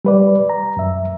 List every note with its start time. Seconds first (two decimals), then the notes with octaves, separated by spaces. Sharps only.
0.05 G3 B4 D5
0.49 A#5
0.77 F#2 E5